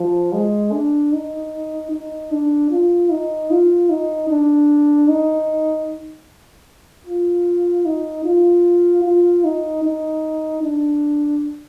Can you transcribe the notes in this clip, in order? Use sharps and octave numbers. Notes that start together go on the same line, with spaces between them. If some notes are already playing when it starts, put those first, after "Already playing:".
Already playing: F3
G#3
D4
D#4
D#4
D4
F4
D#4
F4
D#4
D4
D#4
F4
D#4
F4
F4
D#4
D#4
D4